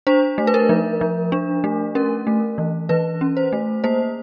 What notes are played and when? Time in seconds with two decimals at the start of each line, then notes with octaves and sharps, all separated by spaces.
0.07 D4 C5
0.38 A3
0.47 B4
0.54 A#4
0.69 F3
1.01 F3
1.32 D4
1.64 A3
1.95 C#4 A#4
2.27 A3
2.58 E3
2.89 E3 B4
3.21 C#4
3.37 C5
3.53 A3
3.84 A#3 C5